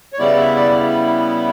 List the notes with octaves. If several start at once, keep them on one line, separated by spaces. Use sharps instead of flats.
C#5
C#3 G3 B3 E4 D5
E5
D5